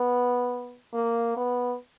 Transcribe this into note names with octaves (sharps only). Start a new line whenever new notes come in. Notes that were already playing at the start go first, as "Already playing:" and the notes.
Already playing: B3
A#3
B3